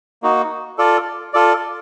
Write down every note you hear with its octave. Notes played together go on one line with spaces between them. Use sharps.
A#3 D#4 F#4
F4 A4 D5
F4 A4 D5